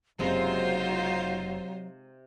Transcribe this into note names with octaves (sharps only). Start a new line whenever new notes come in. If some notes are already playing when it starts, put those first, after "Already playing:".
F#1 C3 F#3 G#3 D#4 F4 C5 A#5